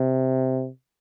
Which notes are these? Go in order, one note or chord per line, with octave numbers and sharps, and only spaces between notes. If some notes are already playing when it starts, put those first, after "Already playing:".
Already playing: C3